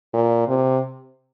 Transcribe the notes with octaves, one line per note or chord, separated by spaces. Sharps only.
A#2
C3